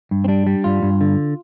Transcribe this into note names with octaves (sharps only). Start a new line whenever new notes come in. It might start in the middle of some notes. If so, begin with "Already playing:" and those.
G2
C4
G3 D4
G3
G2 F4
G2
D3